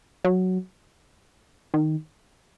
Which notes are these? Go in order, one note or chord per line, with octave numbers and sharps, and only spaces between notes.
F#3
D#3